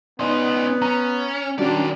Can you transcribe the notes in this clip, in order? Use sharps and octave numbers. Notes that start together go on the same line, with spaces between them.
B3 C#4 D#4 D5 D#5 C6
C#4 A#5
D#3 G3 C#4 D4 F#4 D5